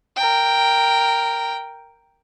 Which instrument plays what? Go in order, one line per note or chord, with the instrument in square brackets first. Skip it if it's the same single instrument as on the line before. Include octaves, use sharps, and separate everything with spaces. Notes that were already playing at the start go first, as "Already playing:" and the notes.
[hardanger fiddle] A#4 G5